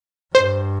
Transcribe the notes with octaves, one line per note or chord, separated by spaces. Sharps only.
G2 C5